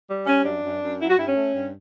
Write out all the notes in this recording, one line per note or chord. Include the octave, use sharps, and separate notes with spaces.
G3
G3 C#4
F#2 D4
F#2
F#2
F#3 E4
F#4
G2 E4
C#4
A3
G2